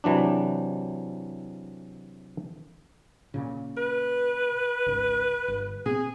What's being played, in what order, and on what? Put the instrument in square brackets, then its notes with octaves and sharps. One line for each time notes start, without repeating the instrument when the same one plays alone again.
[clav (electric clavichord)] C3 E3 F#3 D4
[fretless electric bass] A#2 C#3
[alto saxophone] B4
[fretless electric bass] G#1 C#2 G#2
G1
[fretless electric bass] A#2 B3 C4 [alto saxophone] G#4